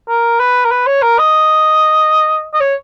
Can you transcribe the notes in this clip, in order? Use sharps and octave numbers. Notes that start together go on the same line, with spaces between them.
A#4
B4
A#4
B4
C#5
A#4
D#5
D#5
C#5